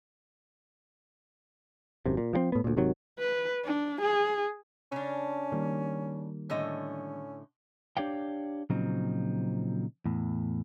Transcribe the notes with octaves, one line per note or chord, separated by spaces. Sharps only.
G#1 F#2 C3
A#2
F3 F#3 C4
A2 B3
D2 A#2
G#1 C3 D#3 F#3
B4
D4
G#4
C#3 C#4 D4
D#3 G3 A#3
A2 D3 C#4 D#5
D4 G4 C#5 D5 F5 G5
A#2 C#3 F3 F#3 C4 D#4
E2 A2